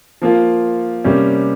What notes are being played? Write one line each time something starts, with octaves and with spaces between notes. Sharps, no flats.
F3 A#3 F4
C3 G3 A#3 C#4